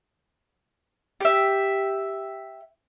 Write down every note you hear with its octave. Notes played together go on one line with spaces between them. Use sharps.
G4 E5